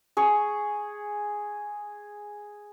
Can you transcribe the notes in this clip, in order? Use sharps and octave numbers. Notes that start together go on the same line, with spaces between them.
G#4 C#6